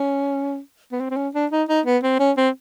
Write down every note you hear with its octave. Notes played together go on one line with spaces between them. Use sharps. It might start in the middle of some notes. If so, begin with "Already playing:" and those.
Already playing: C#4
B3
C4
C4
C#4
D4
D#4
D#4
B3
C4
C#4
C4